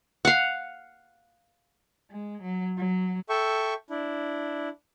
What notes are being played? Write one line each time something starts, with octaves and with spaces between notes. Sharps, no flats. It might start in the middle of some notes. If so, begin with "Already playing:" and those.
F5 F#5
G#3
F#3
F#3
A4 E5 G5 C#6
D4 E4